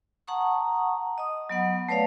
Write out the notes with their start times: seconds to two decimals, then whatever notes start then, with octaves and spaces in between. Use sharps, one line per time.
0.27 F#5 A5 A#5 C#6 D#6
1.18 D#5 D#6
1.49 F#3 B3 F#5
1.89 A3 B4 C#5 D5 F5